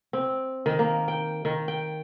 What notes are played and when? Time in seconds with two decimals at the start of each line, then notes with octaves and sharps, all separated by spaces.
0.13 C4
0.66 D#3
0.79 A#3
1.08 G5
1.45 D#3
1.68 G5